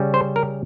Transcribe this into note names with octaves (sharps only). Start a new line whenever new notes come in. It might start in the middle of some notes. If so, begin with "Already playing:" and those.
Already playing: C#3 G3 C#4
C5
A#4